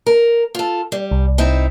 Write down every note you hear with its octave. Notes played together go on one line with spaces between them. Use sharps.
A#4
F4 A4
G3
C2
C4 D#4 E4